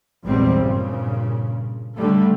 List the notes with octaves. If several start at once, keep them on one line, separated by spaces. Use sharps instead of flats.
A#1 E2 G#2 F#3 G3 C4
G2 A#2 C#3
D3 G3 A3